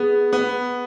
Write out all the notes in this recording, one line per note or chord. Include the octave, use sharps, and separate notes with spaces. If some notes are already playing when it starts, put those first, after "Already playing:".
Already playing: B3 G#4
B3